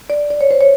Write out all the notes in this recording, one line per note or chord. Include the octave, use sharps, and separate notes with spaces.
D5
D5
C#5
C5
C#5